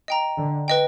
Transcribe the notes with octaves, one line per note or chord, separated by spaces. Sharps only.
D#5 G5 A#5
D3
B4 D#5 G5